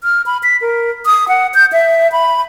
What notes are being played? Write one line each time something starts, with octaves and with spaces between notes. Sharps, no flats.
F6
B5
B6
A#4
D#6
F#5
G6
E5
B5